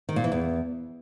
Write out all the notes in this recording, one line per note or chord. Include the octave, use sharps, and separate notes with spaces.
D#3
A#2
E3
E2